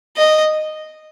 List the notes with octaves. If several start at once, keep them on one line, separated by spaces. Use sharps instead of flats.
D#5